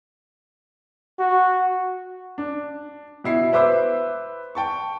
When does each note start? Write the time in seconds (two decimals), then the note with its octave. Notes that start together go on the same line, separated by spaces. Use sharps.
1.19 F#4
2.38 D4
3.24 B2 E4 C7
3.53 B4 C5 E5 B5 D6 E6
4.55 G5 A5 C#6